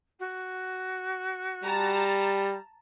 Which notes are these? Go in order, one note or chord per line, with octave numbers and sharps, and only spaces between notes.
F#4
G3 A5 A#5